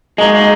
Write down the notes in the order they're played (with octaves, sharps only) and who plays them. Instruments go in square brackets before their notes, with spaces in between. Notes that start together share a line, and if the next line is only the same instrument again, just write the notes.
[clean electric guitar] G#3 [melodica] A#3 D#4 F#4
[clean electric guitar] G#3